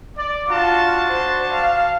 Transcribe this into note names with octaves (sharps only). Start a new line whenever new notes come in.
D5
D4 F4 F#4 A5
C5
F5